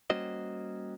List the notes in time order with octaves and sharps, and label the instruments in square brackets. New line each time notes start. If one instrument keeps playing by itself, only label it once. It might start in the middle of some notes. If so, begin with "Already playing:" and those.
[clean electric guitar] G3 A#3 C#4 F#4 C5 D#5